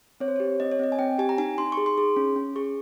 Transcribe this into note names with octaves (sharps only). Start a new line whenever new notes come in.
C4 C#5
C5
G4 C#5
C4 D#5
C#5
C4 D#5
G#5
C4 G5
G4 G#5
A#5
D#4 G#5
D#4 C6
C#6
G#4
C6
G#4
C#4
C#4
G#4 C#6